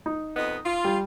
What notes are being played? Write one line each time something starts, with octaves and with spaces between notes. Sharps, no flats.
D#4
F2 B3 D#5
F4
G3